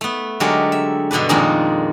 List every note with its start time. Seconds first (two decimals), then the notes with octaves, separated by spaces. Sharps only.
0.01 A3 B3
0.40 D3 F#3 G#3 G4 A4 A#4
0.72 E5
1.11 G2 B2 D3 D4 B4
1.29 F2 A#2 D#3 G#3 D4 D#4